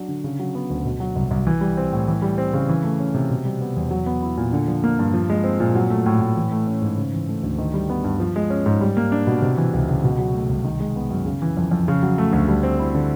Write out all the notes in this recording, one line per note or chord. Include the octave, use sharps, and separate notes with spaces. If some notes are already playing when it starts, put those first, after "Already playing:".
Already playing: F#3 D4
D3
C#3
F#3
B3
D2
B2
F#3
C2
C2
E3
G3
C4
A2
E3
G3
C4
C#3
E3
A3
C#4
C3
B2
G3
B3
E2
F#3
B3
E4
A#2
D3
F3
A#3
G2
F3
G#3
C4
A#2
F#3
A3
A2
A2
E3
A3
C#4
G#2
C#3
E3
A3
D2
D#3
G3
B3
G2
F3
G#3
C#4
G#2
G3
A#3
D4
B2
C3
E3
C#2
C#2
B2
F#3
A3
C2
D#3
G#3
B3
F#2
C#3
E3
F2
F2
C#3
F#3
A3
D2
G3
C4
E4
D3